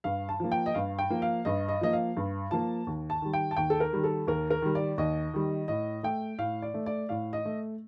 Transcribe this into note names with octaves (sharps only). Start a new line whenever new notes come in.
G2 F5
A5
F3 A#3
G5
D#5
G2 F5
G5
F3 A#3
F5
G2 D#5
D#5
F3 A#3 D#5
F5
G2
F3 A#3 A5
D#2
A5
D#3 G3
G5
A5
D#2 G5
A4
A#4
D#3 G3
A4
D#2 A#4
A#4
D#3 G3
D5
D#2 D#5
D#3 G3
A2 D#5
A3 G5
A2 F5
D5
A3
D5
A2 F5
D#5
A3